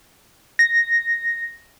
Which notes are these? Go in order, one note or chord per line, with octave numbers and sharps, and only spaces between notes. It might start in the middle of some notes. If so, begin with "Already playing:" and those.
A#6